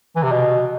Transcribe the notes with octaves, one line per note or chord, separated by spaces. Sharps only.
E3
C3
B2